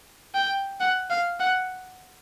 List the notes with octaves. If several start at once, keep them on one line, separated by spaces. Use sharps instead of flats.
G5
F#5
F5
F#5